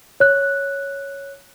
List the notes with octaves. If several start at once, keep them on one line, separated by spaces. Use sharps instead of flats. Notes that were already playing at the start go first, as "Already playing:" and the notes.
C#5 F#6